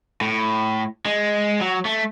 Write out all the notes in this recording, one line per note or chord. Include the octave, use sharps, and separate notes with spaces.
A2
G#3
F#3
A3